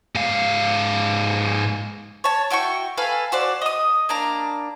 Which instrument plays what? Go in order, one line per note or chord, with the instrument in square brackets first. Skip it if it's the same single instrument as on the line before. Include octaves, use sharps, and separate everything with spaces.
[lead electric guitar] G#2 F5
[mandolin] C#5 A5
E4 F#4 G5 C#6
A4 B4 F5 G#5
F#4 C5 D5
D#5 D#6
A#3 D4 A#5